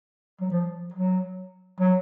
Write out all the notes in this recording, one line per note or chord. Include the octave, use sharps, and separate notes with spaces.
F#3
F3
F#3
F#3